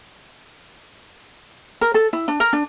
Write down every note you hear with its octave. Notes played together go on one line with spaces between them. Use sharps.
A#4
A4
E4
D4
A#4
D4